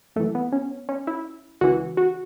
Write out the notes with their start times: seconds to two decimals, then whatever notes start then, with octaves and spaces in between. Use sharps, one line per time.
0.16 F#2 E3 A3
0.35 B3
0.52 C#4
0.89 C#4
1.07 E4
1.61 C#2 C#3 E3 F#4
1.97 F#4